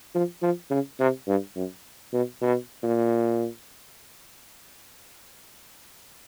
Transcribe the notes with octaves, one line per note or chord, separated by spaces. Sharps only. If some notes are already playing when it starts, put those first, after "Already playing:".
F3
F3
C#3
C3
G2
F#2
B2
B2
A#2